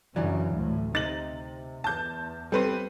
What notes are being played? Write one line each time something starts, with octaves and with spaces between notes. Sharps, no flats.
F#2 C#3 E3 F#3 D4
D2 A2
C3 D#4 A6 F#7
E2 A5 G6
G3 C4 A4 B4 C5